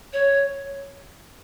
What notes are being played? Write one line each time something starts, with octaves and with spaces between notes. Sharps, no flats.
C#5